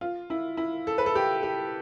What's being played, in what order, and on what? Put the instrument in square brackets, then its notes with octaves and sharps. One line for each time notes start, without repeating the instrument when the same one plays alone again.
[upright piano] F4
E4
E4
A4
B4
A4
G4
G4